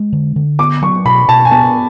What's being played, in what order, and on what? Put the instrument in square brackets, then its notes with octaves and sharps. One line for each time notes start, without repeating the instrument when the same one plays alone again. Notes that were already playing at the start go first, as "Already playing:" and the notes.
Already playing: [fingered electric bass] G#3
D3
D3
[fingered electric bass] B3 [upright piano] D6
[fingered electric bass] F#3 [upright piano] C#6
[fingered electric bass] B2 [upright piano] B5
[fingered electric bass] B2 [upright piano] A5
[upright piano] G#5
[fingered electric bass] B3 [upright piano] A5